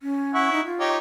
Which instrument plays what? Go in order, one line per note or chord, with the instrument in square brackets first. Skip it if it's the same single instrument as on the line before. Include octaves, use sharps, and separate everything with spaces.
[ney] C#4
[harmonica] E4 F#5 C#6
[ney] D#4
F4
[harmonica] D#4 G4 C#5